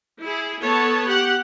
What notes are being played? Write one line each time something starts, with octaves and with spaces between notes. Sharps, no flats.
E4 G#4
B3 A4 C#5 A5
G4 F#5